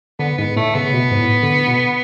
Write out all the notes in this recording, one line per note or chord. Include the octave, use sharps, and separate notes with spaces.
D3 B3
G#2 B3
A2 A3
C#3 B3
B2
G#2
A2
D3
B2